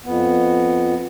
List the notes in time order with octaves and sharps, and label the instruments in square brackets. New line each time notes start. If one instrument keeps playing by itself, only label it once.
[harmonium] F2 B3